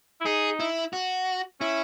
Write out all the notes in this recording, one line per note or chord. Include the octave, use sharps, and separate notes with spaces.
E4
D#4 G#4
E4
F#4
C#4 E4